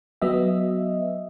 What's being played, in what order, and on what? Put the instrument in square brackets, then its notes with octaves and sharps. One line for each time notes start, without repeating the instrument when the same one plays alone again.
[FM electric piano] F#3 B3 D#5 E5